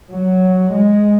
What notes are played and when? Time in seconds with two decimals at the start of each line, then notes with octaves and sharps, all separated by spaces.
0.11 F#3
0.74 G#3